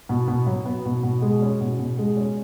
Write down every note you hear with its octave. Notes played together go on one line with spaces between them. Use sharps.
B2
B2
F#3
B3
B2
B2
G#3
C#4
B2
B2
G#3
C#4